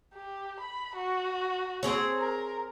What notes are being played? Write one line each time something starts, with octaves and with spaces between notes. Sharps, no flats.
G4
B5
F#4
C4 G#4 C#5
A#4